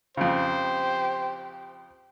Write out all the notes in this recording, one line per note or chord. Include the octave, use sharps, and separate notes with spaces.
F2 C#3 G4 C5